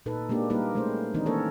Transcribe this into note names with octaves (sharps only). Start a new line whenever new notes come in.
A#2 D#4 A4 B4
G#3 A#3 D4 G4
G3 A#3 D#4 G4 A#4 B4
G#3 A3 C#4 C5
D#3 E3 G#3 C4 D4 D#4
A#3 C#4 A4 A#4 C#5